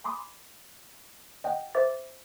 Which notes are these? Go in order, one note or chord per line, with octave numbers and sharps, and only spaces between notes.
G#5 B5 C6 D6 D#6
D#5 F#5 G5
C5 E5 D6 A6